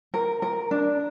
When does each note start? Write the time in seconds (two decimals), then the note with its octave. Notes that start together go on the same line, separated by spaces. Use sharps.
0.14 A#4
0.42 A#4
0.71 D4